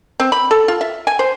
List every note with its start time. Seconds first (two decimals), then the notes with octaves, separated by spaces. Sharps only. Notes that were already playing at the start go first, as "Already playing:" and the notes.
0.20 C4
0.32 B5
0.51 A4
0.68 F4
0.81 E5
1.07 G#5
1.19 C5